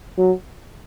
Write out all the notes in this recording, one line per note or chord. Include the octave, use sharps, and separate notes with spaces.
F#3